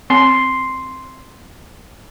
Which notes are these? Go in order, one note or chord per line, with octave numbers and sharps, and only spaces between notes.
C4 C6